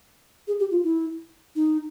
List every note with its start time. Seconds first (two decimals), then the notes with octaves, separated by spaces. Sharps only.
0.48 G#4
0.60 G4
0.71 F4
0.84 E4
1.56 D#4